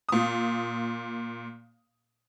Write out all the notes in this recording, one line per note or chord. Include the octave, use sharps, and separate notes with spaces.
A#2 D#6